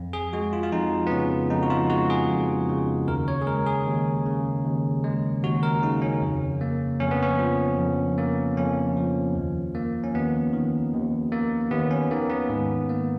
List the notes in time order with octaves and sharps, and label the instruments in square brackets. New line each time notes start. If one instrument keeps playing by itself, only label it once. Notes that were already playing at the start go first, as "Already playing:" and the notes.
Already playing: [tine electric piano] F2
G#4
G#3 F#4
F4
F4
F2 D#4
B3
C#3 C#4
F2 D#4
F#4
F4
G#3 F#4
G#4
F2
C#3
D#2 A#4
C#5
G#4
G#3 A#4
G#4
D#2
C#3
D#2
G#3
D#2 F#4
A#4
C#3 D#4
C#4
F2
A#3
F2 C#4
B3
C#4
F3
F2
A#3
F2 C#4
F3
D#2
A#3
C#4
D#2 B3
D#3
D#2
A#3
D#2 B3
C#4
D#3 A#3
B3
G#2
A#3